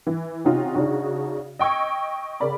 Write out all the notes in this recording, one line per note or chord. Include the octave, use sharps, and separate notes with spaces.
E3
C3 C#4 D#4 F4 F#4
C#3 D4 D#4 F#4
D#5 G5 C#6 E6 G#6
C#3 A#4 D5 B5